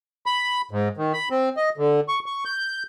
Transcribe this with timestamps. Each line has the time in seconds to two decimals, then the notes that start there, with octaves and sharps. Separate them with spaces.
0.26 B5
0.71 G#2
0.97 D#3
1.13 B5
1.30 C4
1.57 D#5
1.77 D3
2.08 C#6
2.26 C#6
2.45 G6